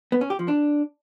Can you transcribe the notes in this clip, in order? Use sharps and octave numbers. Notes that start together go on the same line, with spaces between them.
B3
C#4
G4
F3
D4